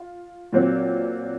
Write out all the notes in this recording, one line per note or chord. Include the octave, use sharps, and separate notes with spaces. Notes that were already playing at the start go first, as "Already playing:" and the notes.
Already playing: F4
A#2 F#3 C4